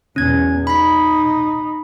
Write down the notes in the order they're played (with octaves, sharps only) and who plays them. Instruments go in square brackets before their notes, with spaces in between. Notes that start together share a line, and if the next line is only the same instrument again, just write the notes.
[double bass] B1 E2 [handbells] C#4 G#6
[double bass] D#4 [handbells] B5 B6